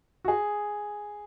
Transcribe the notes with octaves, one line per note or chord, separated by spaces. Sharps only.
F#4
G#4